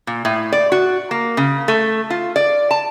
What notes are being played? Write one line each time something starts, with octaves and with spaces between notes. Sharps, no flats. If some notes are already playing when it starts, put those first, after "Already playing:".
A#2
A2
D5
F#4
A#3
C#3
A3
F4
D5
A5